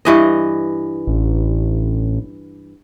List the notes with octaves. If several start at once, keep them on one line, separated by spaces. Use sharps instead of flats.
G2 E3 D#5
A1